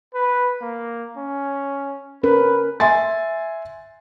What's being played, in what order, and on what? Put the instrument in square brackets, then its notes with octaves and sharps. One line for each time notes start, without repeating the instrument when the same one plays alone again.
[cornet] B4
A#3
C#4
[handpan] C#4 A#4 [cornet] B4
[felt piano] E5 G#5 C6 A6